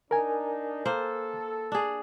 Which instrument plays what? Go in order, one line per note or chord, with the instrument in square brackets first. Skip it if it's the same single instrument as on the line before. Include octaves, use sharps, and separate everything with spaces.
[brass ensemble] D4 D#4 [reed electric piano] A#4 G#5
[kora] A#3 C5 [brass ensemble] A4
[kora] D4 G#4